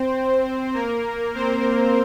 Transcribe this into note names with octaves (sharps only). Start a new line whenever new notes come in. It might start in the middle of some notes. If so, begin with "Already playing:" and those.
Already playing: C4 C5
A#3 A#4
C4 C5